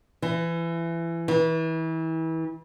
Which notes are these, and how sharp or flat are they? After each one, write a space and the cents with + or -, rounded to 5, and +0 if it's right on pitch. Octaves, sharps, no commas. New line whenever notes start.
E3 +25
E3 -30